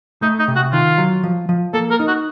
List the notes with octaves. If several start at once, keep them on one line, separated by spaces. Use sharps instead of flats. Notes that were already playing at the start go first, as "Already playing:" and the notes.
A3 D#4
D#4
C3
F#4
D#3 F4
F#3
F3
F3
A#3 A4
A#4
D#4
F#4